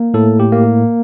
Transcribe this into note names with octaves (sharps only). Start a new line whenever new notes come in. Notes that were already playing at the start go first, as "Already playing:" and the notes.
Already playing: A#3
A2 A4
G4
A#3